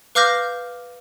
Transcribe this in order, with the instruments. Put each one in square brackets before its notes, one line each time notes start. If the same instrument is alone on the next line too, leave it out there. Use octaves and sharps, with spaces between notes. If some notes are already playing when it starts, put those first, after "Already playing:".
[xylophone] B4 F5 D6 F6 G6 A#6